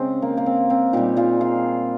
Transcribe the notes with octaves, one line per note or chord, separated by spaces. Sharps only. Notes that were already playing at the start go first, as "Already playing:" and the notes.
Already playing: C#3 G#3 C4
A#3
A#3
C4
C4
A#2 G3 D#4 G4
F4 G#4
F4 G#4